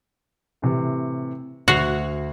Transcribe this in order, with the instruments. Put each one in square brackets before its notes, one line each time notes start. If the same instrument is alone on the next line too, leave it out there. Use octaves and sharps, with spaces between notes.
[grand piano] A2 C3 E3
[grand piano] D2 C7 F7 [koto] F#4